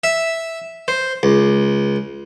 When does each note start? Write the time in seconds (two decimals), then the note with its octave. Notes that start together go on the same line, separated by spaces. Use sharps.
0.04 E5
0.88 C5
1.23 C#2